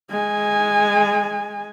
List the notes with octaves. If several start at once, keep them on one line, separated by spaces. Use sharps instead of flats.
G#3 G#5